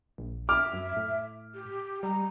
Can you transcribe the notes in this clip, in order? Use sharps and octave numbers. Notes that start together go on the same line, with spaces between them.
A#1
E5 D6 F6
F#2
A2
G4
G3 A#5